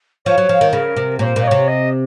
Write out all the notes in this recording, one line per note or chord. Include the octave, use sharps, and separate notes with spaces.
F3 C#5
F#3
F3
D#3
C#3 A#4
C3
A#2 C5 C#5
A#2
D#5
C3 C#5
D#5